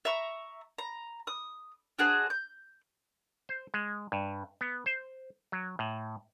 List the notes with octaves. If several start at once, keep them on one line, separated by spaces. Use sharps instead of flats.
E5 A#5 C#6
A#5
D#6
D4 F#4 G#4 C5
G6
C5
G#3
G2
B3
C5
F#3
A2